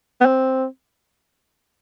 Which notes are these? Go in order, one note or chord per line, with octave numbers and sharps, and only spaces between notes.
B3
C4